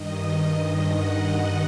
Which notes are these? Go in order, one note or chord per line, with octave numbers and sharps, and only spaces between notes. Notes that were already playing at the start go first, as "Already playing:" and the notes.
Already playing: G2 D#3 D#5
D#5
F#5